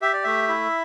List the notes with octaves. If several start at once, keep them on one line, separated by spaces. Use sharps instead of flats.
G4 E5
D5
A3 E5
E4